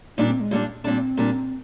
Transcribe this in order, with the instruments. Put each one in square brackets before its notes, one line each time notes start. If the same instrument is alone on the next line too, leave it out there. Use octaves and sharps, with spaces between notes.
[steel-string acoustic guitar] A#2 G3 D4 [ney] D#4
[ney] C4
G#3
[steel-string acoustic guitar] A#2 G3 D4
[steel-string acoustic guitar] A#2 G3 D4 [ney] C4
[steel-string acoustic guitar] A#2 G3 D4